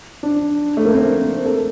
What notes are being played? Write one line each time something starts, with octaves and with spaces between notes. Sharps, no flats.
D4
A3
A#3
C4
A4